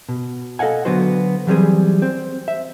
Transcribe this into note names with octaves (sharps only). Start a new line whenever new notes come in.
B2
A4 D#5 F5 F#5 G#5
D3 F#3 B3 D4 F#4 C5
E3 F#3 G3 B3 C4 G#4
C4 C5
E5